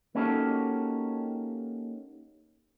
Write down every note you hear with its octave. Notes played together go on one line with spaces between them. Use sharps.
A#3 C#4 D#4 F#4 G4 A4